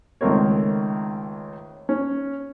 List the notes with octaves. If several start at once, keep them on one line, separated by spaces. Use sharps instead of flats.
C#2 D#3 A3 C4 A#4 C#5
C#4